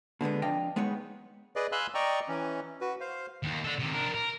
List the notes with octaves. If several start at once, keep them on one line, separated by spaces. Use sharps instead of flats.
B2 D3 G#3 B3
F2 D4 D#5 F5 G5
G#3 B3 D#4 B4 C#5
G#4 B4 D5 D#5
F5 G#5 B5 C6 E6 F#6
D5 D#5 G5 A#5 C#6
E3 C#4
F#4 B4
C5 F5
D#2 D#3
D4 A4
C3 D#3
D4 A#4
A#4